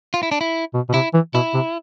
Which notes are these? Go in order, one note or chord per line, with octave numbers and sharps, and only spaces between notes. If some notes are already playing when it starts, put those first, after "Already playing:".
F4
E4
D4
E4
B2
B2
C3 E4
E3
B2 E4
C3